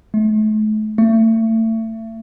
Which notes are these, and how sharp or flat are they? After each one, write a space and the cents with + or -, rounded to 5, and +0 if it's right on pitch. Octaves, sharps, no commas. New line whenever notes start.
A3 -40
A3 +30